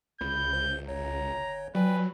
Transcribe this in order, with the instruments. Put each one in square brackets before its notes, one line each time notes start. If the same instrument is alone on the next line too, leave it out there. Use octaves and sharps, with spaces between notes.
[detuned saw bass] C#2 [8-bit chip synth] B5 [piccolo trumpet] G6
[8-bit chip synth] C5
[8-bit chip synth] G1 C#5 [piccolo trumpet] A#5
[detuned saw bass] F#3 [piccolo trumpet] B4 [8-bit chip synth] D5 G5 G#5